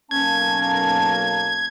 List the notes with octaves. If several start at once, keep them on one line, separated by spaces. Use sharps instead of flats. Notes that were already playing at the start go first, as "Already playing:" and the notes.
B1 A#3 C#4 A5 G#6